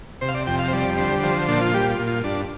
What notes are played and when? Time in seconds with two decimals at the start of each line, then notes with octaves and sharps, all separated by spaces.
0.21 C3 C5
0.29 F5
0.34 D5
0.47 F2 G5
0.59 F5
0.68 C5
0.73 G3 D5
0.98 D3 C5
1.23 F3 C5
1.48 A#2 D4
1.61 F4
1.74 G3 G4
1.91 F4
1.99 A#2
2.07 F4
2.24 G2 D4